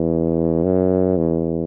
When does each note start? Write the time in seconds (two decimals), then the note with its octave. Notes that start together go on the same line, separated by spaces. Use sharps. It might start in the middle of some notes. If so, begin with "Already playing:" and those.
Already playing: E2
0.64 F#2
1.17 E2